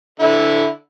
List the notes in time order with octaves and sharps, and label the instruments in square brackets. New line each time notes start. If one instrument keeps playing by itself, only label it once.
[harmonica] D3 E4